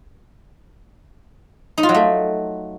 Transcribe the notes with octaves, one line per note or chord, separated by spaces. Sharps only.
D#4
F4
F#3
A3